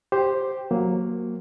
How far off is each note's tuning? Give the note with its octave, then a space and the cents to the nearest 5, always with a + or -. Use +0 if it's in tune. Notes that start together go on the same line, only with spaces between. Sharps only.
G4 +0 C5 +0
F#3 -10 A#3 +0